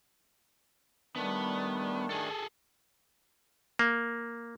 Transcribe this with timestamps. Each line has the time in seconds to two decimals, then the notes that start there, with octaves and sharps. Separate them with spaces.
1.16 D#3 G3 A3 B3 D4
2.10 G#4 A4
3.79 A#3